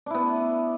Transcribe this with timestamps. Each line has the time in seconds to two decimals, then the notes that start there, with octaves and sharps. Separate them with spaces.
0.06 D4
0.10 E4
0.14 B3